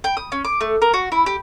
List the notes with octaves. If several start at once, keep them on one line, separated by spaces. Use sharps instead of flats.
G5
D#6
C#4
D6
A3
A#4
F#4
E4
G4